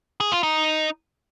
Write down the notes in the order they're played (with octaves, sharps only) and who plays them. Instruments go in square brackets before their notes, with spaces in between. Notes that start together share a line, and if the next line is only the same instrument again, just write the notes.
[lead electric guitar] G#4
F4
D#4